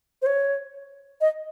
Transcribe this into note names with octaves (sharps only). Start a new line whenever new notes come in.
C5
C#5
D#5